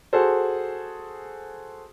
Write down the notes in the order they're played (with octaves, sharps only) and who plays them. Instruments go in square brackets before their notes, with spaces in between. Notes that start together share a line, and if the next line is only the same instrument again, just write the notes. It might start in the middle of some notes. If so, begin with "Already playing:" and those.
[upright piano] F#4 G#4 A4 C5